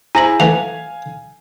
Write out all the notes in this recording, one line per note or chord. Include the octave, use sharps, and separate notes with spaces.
E4 G#4 C5 G#5 A#5 A#6 F#7
E3 A3 F#4 F5 G#5 F7